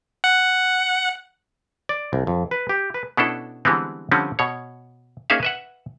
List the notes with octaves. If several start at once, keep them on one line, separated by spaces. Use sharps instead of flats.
F#5
D5
C2
F2
B4
G4
B4
B2 B3 C#4 D4 E4 A4
D3 E3 G3 G#3 B3 C4
D3 F3 G3 C4 C#4
B2 C#5
A#3 C#4 D#4 G#4 E5 F5
B4 E5 F#5